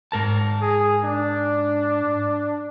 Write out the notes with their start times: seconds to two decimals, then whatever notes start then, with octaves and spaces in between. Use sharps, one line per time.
0.12 G#2 A#4 A5
0.61 G#4
1.04 D4